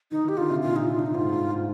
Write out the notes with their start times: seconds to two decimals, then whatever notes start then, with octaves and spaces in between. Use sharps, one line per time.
0.11 D#3 D#4
0.24 D#3 G4
0.37 D3 F4
0.50 C3
0.62 A#2 F4
0.76 D#4
0.90 F4
0.99 D4
1.06 D#4
1.14 G#2 F4
1.31 G2
1.48 G#2